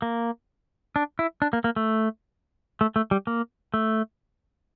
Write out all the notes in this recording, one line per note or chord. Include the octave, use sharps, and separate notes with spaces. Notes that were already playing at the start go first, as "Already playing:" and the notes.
A#3
D4
E4
D4
A#3
A#3
A3
A3
A3
G3
A#3
A3